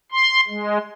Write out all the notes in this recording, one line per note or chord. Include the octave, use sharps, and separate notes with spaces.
C6
G#3